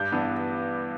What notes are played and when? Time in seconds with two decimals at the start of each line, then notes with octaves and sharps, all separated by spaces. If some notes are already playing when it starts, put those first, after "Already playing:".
Already playing: G2 G6
0.12 E3 B3 D4